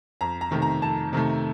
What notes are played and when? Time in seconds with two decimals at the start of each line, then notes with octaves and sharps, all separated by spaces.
0.21 F2 A#5
0.41 A#5
0.51 C3 D#3 A3
0.62 A#5
0.82 F2 A5
1.13 C3 D#3 A3